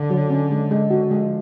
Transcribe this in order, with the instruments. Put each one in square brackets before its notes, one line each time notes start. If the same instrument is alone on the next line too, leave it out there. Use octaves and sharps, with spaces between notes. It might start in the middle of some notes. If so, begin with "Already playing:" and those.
Already playing: [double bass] D3
[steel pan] F#3
C#4
G#3
G#3
F#4
[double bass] F3 [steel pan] G#3